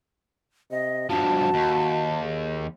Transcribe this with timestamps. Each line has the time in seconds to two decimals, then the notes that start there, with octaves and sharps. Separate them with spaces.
0.71 C3 D#5
1.10 G2 F3 F#4 A5
1.54 D#2
2.22 G#4